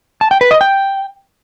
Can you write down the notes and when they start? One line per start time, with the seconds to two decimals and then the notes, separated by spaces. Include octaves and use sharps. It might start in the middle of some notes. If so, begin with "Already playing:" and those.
0.21 A5
0.31 G5
0.41 B4
0.51 D#5
0.61 G5